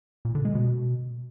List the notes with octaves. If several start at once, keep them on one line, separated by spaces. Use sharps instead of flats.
A#2
D3
G#3
B2